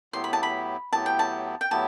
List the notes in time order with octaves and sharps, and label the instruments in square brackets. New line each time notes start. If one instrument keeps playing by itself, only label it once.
[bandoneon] A2 F#3 B3 E4 G4 [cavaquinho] C6
[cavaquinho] B5
A5
B5
[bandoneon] A2 F#3 B3 E4 G4 [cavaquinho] A5
[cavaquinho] G5
A5
G5
[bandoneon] A2 F#3 B3 E4 G4 [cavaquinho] A5